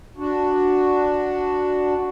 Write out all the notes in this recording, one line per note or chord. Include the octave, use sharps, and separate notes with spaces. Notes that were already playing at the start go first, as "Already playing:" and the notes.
D4 F#4